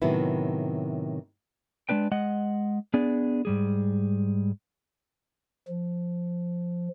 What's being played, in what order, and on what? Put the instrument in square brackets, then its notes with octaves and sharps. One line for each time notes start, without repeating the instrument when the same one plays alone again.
[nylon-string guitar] A2 C3 D#3 F#3 B3 E4
[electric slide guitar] G#3 B3 D4 B4 G5
G#3 D#5 F#5
B3 D4 G#4 D5
G#2 G3 G#4
[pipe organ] F3